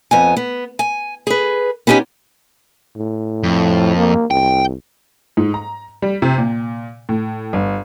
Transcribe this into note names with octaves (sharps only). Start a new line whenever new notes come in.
F2 B3 G#5
B3
G#5
G#4 B4
B3 C#4 D#4 G4 G#5
A2
F2
A#3
C2 G5
G#2
A#5
G3
C3
A#2
A2
G1